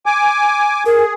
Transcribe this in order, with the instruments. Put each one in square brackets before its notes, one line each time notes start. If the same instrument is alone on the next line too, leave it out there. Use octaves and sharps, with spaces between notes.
[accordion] G#5 D6
[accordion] G#4 [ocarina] A#4